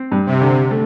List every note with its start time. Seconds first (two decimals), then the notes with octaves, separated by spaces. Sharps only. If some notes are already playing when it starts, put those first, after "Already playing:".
Already playing: C4
0.12 G2
0.26 C3
0.41 D3
0.71 A3